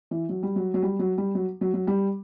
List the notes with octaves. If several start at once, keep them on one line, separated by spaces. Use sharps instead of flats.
E3
F#3
G3
F#3
F#3
G3
F#3
G3
F#3
F#3
F#3
G3